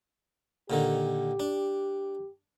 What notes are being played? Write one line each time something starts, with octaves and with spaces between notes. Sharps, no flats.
A#2 D3 D#3 G4
D4